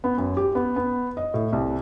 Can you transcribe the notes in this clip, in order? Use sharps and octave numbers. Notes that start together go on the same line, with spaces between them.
B3
F#2
G4
B3
B3
D#5
A2
C2